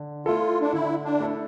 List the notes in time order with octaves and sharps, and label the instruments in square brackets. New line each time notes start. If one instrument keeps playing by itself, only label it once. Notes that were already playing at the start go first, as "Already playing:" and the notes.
Already playing: [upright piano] D3
[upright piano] A3 E4 A4 [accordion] F4
[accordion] D4
[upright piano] D3 [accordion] E4
[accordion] D4
[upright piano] A3 E4 A4